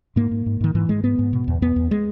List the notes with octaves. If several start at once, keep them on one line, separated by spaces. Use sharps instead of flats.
G#2 A#3
G#2
G#2
G#2 D#3
G#2 E3
G#2 G#3
G#2 B3
G#2
B2
E2
E2 B3
E2
G#3